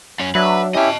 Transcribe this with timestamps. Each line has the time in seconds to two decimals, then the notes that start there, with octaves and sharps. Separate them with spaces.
0.20 F#2 C#4
0.35 F#3 D4 B4 E5
0.74 C#4 E4 G4 D#5 A5